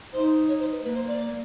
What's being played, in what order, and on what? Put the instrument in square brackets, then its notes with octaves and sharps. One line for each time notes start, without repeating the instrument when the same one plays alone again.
[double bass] D#4 [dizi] C5
[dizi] C#5
C5
B4
[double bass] A#3 [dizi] B4
[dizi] C5
D5